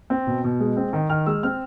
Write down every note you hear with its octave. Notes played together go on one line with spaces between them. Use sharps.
C4
B2
B2
G#3
C4
D#3
D#3 F6
G#3 E6
C4 F6